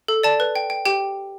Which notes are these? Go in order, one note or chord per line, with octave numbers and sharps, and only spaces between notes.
A4
D5 A5
B4
G5
G5
G4 G5